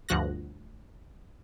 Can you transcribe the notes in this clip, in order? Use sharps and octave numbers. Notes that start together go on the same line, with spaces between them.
D2 G2 F3 F#4 F#6 A#6